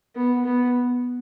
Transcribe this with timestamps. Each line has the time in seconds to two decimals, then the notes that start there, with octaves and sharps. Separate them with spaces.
0.15 B3
0.45 B3